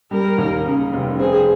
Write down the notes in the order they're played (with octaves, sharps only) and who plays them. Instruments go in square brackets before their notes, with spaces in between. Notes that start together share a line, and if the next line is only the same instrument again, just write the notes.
[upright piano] G3 [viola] A#4
[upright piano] D#2
C#3
F1
[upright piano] C4 [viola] G#4